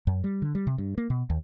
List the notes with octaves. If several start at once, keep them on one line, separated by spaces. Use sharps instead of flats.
F#2
G3
D3
G3
C3
G2
A#3
B2
D#2